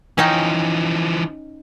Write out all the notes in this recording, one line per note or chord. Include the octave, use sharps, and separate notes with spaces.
E3 F3 C#4 D#4 G5